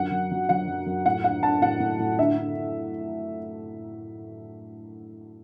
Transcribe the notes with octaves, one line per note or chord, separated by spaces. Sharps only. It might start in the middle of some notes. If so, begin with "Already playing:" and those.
Already playing: F#2 D3 F#5
F#2
F#3
F#3 F#5
F#2
F#2
A2 F#5
D4 F#5
D4 A5
A2 F#5
A2
A2
D3 E5
D3
D3